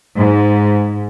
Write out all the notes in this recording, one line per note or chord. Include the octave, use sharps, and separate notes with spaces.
G#2